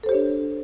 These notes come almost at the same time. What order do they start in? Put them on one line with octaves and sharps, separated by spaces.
A4 C5 G4 C#5 D4